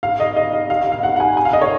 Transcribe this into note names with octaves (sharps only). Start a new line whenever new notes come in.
F5
D#5
D#5
D#5
F5
F5
F5
F#5
F#5
G#5
G#5
F5
D#5
C#5